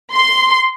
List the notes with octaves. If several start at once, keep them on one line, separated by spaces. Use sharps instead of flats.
C6